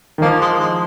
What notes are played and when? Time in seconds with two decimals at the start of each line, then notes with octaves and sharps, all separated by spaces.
0.18 D#3
0.22 F3 A#3
0.41 G#3
0.60 G#3